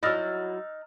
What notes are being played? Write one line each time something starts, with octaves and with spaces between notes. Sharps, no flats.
F#3 D#4 E4 E6 F6 A6